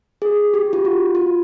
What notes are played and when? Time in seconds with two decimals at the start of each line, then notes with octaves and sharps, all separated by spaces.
0.22 G#4
0.54 G4
0.73 F4
0.85 F#4
1.15 F4